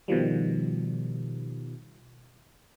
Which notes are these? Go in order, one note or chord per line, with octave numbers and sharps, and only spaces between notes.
B2 D#3 F3 G3